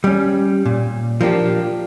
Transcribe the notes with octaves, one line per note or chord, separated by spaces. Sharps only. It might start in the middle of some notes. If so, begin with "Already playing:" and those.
G3 C#4
A#2
F3 A#3 D4 G4